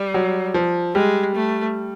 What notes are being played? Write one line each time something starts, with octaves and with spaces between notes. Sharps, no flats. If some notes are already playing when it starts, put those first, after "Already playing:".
Already playing: G3
F#3
F3
G3 G#3
A3